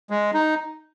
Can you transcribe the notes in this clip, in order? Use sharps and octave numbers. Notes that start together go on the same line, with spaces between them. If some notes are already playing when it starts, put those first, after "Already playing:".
G#3
D#4